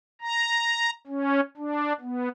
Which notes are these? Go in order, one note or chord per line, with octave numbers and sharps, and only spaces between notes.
A#5
C#4
D4
B3